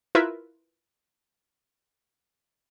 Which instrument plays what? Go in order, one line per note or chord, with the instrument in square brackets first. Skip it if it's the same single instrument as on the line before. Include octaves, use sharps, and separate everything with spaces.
[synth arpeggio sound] E4 F4 A#4 B4 E5